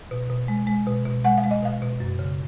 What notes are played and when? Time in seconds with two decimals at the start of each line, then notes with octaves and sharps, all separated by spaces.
0.11 B2
0.30 B2
0.48 G#3
0.67 G#3
0.87 B2
1.05 B2
1.25 G#3 F#5
1.38 F5
1.44 G#3
1.51 D#5
1.62 B2 F5
1.82 B2
2.00 F#2
2.19 C#3